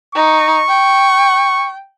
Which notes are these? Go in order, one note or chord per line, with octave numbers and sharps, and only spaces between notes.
D#4 C#6
G5